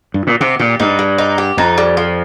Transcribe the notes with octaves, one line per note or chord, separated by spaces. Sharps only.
G2
A#2
C3 G4
A#2 G4
G2 D#4
G3
D#4
G4
F2 D#4
G3
F3